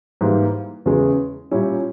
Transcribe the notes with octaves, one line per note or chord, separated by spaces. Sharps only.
G#2 E3 G3 A#3
E2 C#3 G#3
A#2 G3 C#4 E4